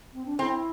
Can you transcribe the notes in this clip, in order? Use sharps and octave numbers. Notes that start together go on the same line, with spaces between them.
C4
D4
C4 E4